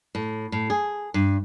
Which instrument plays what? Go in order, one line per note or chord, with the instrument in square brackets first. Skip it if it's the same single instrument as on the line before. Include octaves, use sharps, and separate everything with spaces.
[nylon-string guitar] A2
A2
G#4
G2